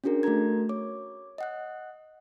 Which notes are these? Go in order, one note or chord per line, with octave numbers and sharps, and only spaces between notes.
C#4 D4 F#4 G#4 A#4
A3 F#4 A4 A#4 A#5 G#6
C#5 D6
D#5 F#5 F#6